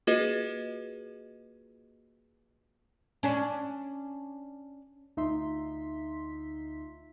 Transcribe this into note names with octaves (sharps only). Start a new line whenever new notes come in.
A#3 F4 F#4 G#4 B4 D#5
C#4 D4
D2 D#4 F4 E5 C6 B6